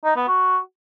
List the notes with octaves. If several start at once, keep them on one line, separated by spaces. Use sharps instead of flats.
D#4
B3
F#4